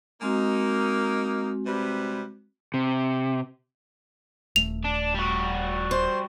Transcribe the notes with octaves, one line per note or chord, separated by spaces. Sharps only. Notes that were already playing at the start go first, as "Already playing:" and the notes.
G#3 A#3 C4 D#4 F#4
C3 G3 B4
C3
D#1 A3 F7
D4
G3 F#4
C5